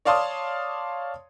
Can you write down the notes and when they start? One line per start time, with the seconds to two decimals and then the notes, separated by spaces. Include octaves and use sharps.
0.05 C#5 D5 F5 A5 C6 D#6